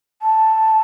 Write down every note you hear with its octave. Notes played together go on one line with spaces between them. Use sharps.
A5